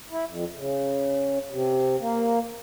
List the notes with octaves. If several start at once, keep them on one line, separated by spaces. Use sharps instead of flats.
E4
F2
C#3
C3
A#3